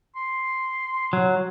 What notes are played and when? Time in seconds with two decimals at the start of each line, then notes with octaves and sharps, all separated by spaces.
0.16 C6
1.13 F#3